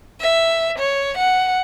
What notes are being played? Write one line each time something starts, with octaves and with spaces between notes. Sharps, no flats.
E5
C#5
F#5